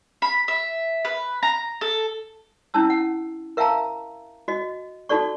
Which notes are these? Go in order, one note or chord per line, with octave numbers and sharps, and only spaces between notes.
B5
E5
B4
A#5
A4
C#4 D4 E4 A5 E6
F#5
A#4 E5 F5 G5 A5 A#5
F#4 D#5
D#4 F#4 A4 D5 C#6